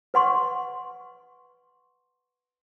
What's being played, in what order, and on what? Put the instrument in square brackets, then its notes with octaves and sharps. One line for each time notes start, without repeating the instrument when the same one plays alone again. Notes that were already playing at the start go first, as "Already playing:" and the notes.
[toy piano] B4 F#5 C6 C#6